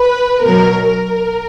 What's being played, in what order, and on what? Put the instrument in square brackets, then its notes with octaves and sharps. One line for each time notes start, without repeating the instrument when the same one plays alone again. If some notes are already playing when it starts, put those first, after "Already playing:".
Already playing: [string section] B4
B2 F#3 A#4
A#4